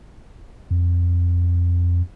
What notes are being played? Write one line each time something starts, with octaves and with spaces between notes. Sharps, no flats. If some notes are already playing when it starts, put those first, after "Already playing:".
F2